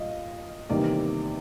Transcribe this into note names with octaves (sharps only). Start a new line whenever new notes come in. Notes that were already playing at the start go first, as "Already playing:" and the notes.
Already playing: A#2 G3 D#5 F5
E2 C3 D#3 G3 A#3 D5